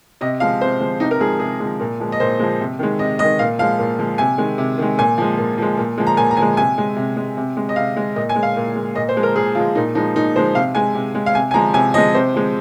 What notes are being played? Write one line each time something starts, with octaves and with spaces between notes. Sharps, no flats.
C3 D#5
F3 G#3 F5
C3 C5
F3 G#3
C3 D#4
A#4
F3 G#3 G#4
C3 G#4
F3 G#3
A#2
F3 G#3
D#5
A#2 C5
F3 G#3
C3
D#3 G#3
C3 D#5
D#3 G#3 D#5
A#2 F5
F3 G#3 F5
A#2
F3 G#3
C3 G#5
D#3 G#3
C3
D#3 G#3
A#2 G#5
F3 G#3
A#2
F3 G#3
A#2
F3 G#3
A#5
A#2 G#5
A#5
F3 G#3 G#5
C3 G#5
G#3
C3
G#3
C3
G#3
D#5
C3 F5
G#3
A#2 D#5
G#5
G#3
F5
A#2
G#3
A#2 D#5
C5
F3 G#3
A#4
A#2 G#4
F3 G#3 F4
A#2 D#4
F3 G#3 D#4
A#2 D#4
F3 G#3 C5
C3 F5
G#3 G#5
C3
G#3
F5
C3 G#5
G#5
F3 G#3 A#5
C3 G#5
F3 G#3 D#5
C3 C5
F3 G#3